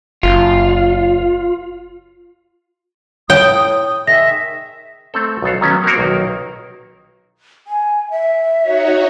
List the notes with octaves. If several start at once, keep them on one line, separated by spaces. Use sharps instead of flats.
F#1 F4
A2 C#5 G5 D#6
D#3 G#3 E5 A#6
A3 C4 A4
B1 B3 A4 F5
D#3 F#3 A3 B3 C#4
A#3 C4 F#4 A#4
B1 D#3
G#5
E5
D#4 F#4 C#5